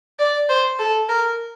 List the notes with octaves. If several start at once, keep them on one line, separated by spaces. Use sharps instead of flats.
D5
C5
A4
A#4